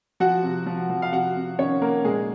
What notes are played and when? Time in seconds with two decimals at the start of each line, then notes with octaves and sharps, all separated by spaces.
0.20 F3 F#4 F#5
0.43 C3
0.66 F3
0.90 F3
1.02 F5
1.12 C3 F#4 F#5
1.36 C3
1.59 D#3 C#4 C#5
1.82 D#3 A#3 A#4
2.05 A#2 G#3 G#4